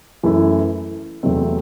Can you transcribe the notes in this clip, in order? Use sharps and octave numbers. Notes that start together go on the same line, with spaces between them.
F#2 E3 A3 E4
E2 C3 F#3 A3 C4